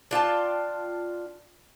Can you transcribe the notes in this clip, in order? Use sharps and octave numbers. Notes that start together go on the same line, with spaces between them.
D4 F4 G5 A5